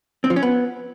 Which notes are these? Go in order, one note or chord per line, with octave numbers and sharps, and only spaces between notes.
C4
F3
C#4
B3